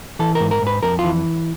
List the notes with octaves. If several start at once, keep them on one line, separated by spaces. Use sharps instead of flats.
E3 A4
A#4
G#2
A#4
G#2 B4
F2 A#4
F4
E3